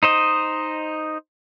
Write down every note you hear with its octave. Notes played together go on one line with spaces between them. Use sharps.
D#4 C5 D#5